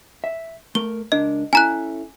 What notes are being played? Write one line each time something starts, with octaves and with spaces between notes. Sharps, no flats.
E5
A3 A#4 G7
C#2 D4 A#4 D#5
C#4 E4 A4 G#5 A#5 F#6